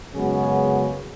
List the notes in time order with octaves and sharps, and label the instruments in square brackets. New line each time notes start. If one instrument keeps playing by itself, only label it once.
[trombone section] F#2 C#3 G#3 B3 C#4 F#4